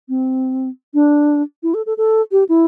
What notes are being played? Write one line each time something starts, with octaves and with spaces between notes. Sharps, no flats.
C4
D4
E4
A4
A4
A4
G4
E4